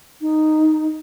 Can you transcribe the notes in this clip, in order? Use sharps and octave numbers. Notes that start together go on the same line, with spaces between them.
D#4